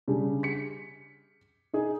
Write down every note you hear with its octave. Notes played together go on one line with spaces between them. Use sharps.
C#3 G3 D4
B6 C#7
D#4 G#4